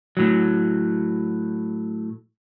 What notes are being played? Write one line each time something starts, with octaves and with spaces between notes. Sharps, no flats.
A2 F#3